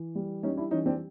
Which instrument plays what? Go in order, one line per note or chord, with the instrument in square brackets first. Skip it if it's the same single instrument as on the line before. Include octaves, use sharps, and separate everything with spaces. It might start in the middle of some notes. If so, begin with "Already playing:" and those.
Already playing: [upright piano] E3
G3
G3 C#4 D#4
D4 E4
E3 C#4 D#4
C4 D4